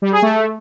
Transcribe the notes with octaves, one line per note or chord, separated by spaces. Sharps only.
G3
G#4
A3